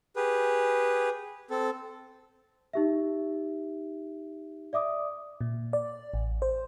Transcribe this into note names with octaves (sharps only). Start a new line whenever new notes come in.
G4 G#4 B4
C4 A4
D#4 G4 E5
D5 E5 D6 D#6
A#2
D5
A1
C5